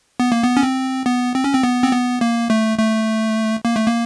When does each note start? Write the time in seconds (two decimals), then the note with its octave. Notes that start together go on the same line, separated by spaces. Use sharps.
0.20 B3
0.32 A#3
0.43 B3
0.57 C#4
0.63 C4
1.06 B3
1.35 C4
1.44 C#4
1.53 C4
1.63 B3
1.83 C4
1.92 B3
2.21 A#3
2.50 A3
2.78 A3
3.65 A#3
3.76 A3
3.88 A#3